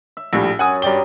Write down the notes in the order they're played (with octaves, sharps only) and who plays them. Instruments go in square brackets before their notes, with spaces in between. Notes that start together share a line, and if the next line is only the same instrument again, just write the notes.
[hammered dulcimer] E5
[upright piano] A#1 A2 G3
[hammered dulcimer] F#2 [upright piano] F#5 G#5 D#6
[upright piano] G2 D5 G7 [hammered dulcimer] F#3 G4